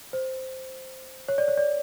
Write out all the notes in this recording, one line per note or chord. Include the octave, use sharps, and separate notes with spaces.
C5
C#5
D5
C#5
D5